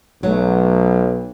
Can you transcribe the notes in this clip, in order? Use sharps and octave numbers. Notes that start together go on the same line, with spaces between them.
B1 F#3 A3